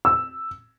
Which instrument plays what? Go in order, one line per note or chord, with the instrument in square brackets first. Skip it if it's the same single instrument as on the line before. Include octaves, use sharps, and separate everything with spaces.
[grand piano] E6